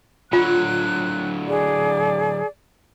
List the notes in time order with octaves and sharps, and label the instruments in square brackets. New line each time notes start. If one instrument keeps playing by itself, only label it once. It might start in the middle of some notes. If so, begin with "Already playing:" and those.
[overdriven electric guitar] D3 F#3 [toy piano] F4 [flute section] F#6
[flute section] G#4 D5